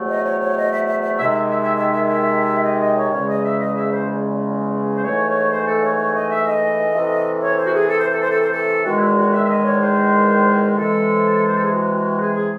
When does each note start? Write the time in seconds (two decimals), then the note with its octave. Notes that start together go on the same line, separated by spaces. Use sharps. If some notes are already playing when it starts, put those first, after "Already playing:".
Already playing: E2 C3 F#3 A3
0.09 D#5
0.25 C#5
0.41 C#5
0.57 D#5
0.73 E5
0.88 E5
1.03 E5
1.18 E5
1.21 C3 D#3 G#3
1.32 E5
1.47 E5
1.63 E5
1.78 E5
1.92 E5
2.07 E5
2.64 D#5
2.80 D#5
2.96 C#5
3.11 E2 C#3 G#3 C#5
3.28 D#5
3.43 E5
3.59 D#5
3.75 E5
3.91 C5
4.96 C5
5.02 G#2 E3 A3 C#5
5.27 C#5
5.51 C5
5.66 A4
5.82 C#5
5.98 C#5
6.15 D#5
6.30 E5
6.46 D#5
6.93 C3 E3 A3
7.42 C#5
7.57 C5
7.66 F#4
7.73 G#4
7.89 A4
7.99 C5
8.10 A4
8.21 C5
8.30 A4
8.41 C5
8.52 A4
8.84 E2 D#3 G#3 F#4
8.97 E4
9.00 F#4
9.17 F#4
9.32 E5
9.44 E5
9.48 D#5
9.64 C#5
9.80 C5
10.75 C3 E3 G#3 A4
11.46 C5
11.55 A4
11.63 G#4
11.71 F#4
11.95 F#4
12.19 G#4
12.35 G#4